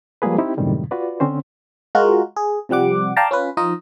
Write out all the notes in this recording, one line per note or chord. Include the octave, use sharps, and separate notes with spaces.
F3 G3 G#3 A#3 G#4 B4
C4 D#4 E4 G4
F#2 A2 C3 D#3 G3 G#3
F4 F#4 B4 D5
D3 C4 C#4 C5
G#3 F4 F#4 A#4
G#4
C3 F3 G3 F#5 D6
D5 F5 G5 A5 A#5
C#4 F4 B4
F3 D#4 F4 D#5